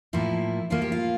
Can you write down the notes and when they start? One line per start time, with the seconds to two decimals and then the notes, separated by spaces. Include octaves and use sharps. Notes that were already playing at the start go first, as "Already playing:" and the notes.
0.13 A2 F3 A#3 E4
0.70 A2 F3 A#3 F4
0.82 G4
0.92 F4